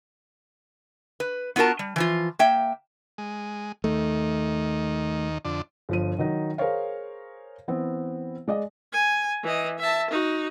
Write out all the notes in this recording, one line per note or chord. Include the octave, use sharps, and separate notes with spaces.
B4
B3 F4 F#4 A#4 A5
G3
E3 F3 F4
A#3 E5 G5
G#3
D#2 D#3 A3
F2 D3 D4
G1 F3 D#7
D#3 F#3 D#4
G#4 A#4 C5 C#5 F5
E3 B3 C4
G#3 D5 D#5
G#5
E3 D#5
E5 A5
D#4 F#4